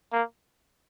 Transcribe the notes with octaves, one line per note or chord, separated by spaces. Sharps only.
A#3